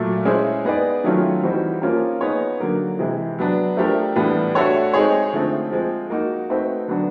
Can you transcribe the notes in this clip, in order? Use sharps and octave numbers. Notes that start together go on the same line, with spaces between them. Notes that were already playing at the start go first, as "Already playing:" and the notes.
Already playing: A#2 F#3 A3
G#3 C#4 E4 G#4 C5
B3 D#4 G#4 B4 D5
D#3 F#3 A3 C#4 F4
E3 G3 C4 D#4 F#4
F3 A#3 C#4 F4 A#4
B3 D#4 G#4 C#5
D3 F#3 A#3
C3 E3 G#3
F#3 B3 D4
F3 A3 D4 G4 A#4
A2 E3 G3 B3 D4
A3 D4 F#4 A4 C#5
G#3 C4 D#4 G#4 C#5
D3 F3 A3 C4
F3 G#3 C4
A#3 D#4 F#4
A3 C4 D#4 F#4 B4
D3 F#3 B3 D4 F#4